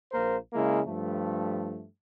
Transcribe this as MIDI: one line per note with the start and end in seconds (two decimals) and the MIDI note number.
0.11 0.36 34
0.11 0.36 58
0.11 0.36 70
0.11 0.36 72
0.53 0.80 49
0.53 0.80 56
0.53 0.80 58
0.53 0.80 64
0.86 1.85 43
0.86 1.85 53
0.86 1.85 57